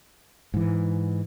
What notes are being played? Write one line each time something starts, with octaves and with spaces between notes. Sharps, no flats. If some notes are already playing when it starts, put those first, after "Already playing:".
G#2 E3